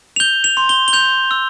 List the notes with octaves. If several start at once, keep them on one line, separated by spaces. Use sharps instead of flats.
F7
G6 G7
F7
C6
G7
G7
G6 F7
E6